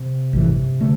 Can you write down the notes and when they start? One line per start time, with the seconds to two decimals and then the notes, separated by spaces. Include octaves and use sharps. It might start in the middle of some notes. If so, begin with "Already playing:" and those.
Already playing: C3
0.33 A1 G2 E3
0.80 D3 A3